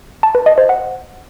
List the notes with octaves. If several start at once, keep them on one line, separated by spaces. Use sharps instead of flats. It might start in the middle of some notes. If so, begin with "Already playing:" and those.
A5
B4
D#5
C5
F#5